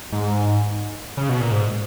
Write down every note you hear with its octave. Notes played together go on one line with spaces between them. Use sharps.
G#2
C#3
B2
A#2
G#2